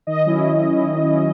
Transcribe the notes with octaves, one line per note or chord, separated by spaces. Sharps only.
D#3 D#5
F#3 C#4 E4
D#3
F#3 C#4 E4
D#3
F#3 C#4 E4